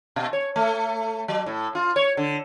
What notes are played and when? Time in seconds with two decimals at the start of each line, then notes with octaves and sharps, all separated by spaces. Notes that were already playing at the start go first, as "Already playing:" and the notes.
0.16 B2
0.33 C#5
0.56 A3
1.28 F#3
1.46 A2
1.75 F4
1.96 C#5
2.17 D3